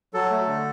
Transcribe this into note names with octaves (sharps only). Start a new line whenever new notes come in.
F#3 A4
A3
D3